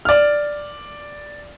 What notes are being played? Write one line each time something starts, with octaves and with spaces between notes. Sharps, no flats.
D5 F6